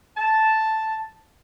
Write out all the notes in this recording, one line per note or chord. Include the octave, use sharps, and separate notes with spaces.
A5